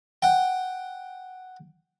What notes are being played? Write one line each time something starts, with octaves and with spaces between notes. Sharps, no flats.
F#5 G5